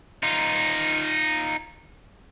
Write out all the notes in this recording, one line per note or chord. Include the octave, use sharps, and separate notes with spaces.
D#4 F4